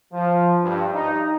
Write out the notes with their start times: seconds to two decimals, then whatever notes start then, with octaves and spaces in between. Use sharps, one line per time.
0.13 F3
0.62 G2
0.94 D#4